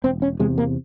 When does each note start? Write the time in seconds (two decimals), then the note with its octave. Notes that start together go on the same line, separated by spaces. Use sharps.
0.04 E1 C4
0.22 C#4
0.40 E2 C3 G#3
0.58 A#3